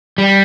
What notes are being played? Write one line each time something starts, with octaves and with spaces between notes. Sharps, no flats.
G3